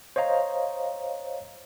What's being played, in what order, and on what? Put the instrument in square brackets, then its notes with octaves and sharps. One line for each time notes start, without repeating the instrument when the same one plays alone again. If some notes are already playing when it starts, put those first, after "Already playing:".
[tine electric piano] C5 C#5 D#5 F5 A#5